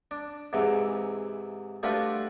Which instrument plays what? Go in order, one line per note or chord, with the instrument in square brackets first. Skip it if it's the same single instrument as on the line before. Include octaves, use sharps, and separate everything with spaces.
[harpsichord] D4
G#2 C3 E3
G3 A3 D4 F4 F#4 B4